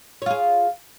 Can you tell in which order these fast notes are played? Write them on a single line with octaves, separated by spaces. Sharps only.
C#5 F4 G#4